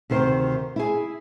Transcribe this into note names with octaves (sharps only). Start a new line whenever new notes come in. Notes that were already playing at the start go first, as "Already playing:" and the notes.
D2 C3 D#3 C5
E4 G#4